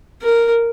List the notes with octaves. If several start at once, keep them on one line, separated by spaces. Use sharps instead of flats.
A#4